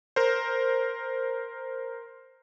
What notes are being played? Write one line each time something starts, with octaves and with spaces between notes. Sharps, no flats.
A#4 C5